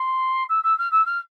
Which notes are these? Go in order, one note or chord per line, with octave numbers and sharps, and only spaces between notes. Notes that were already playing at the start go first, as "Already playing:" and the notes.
Already playing: C6
E6
E6
F6
E6
F6